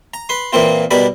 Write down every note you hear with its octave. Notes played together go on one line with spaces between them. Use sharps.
A#5
B4 C6
A#2 E3 A#3 C4 F4
B2 G3 A#4 D5 B5